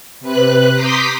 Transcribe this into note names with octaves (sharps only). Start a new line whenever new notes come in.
C3 B4 F#6
A#5 C6 D6 D#6 G6 B6